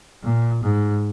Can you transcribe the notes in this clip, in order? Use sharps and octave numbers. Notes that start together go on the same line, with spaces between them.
A#2
G#2